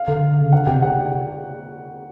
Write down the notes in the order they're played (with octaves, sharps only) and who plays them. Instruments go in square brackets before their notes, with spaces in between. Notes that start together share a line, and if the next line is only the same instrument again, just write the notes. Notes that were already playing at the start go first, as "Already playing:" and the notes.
Already playing: [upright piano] F5
[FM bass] D3
C#3
[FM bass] D3 [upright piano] F#5
[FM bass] C3 [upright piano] G5
[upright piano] F#5